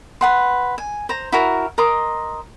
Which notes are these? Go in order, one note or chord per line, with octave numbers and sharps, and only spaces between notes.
B4 F#5 C6
G#5
C5 A#5
E4 F#4 A#4 A#5
A#4 D#5 C6 D6